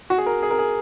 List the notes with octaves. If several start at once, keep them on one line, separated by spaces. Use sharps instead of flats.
F#4
G#4
A#4
G#4
A#4
G#4